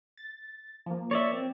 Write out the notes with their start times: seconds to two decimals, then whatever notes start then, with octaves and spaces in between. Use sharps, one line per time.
0.17 A6
0.86 F3 A#3
1.11 C#5 D5 E5
1.33 C4